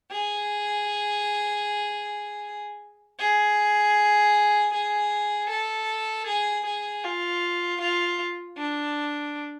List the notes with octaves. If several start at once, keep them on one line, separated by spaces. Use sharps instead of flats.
G#4
G#4
G#4
A4
G#4
G#4
F4
F4
D4